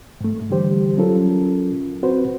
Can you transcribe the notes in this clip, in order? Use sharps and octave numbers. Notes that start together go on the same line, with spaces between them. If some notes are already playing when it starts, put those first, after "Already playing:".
G#2 A3
D3 E3 G3 G4 C5
F#3 C#4 F4 A4 A#4
C4 F#4 B4 C5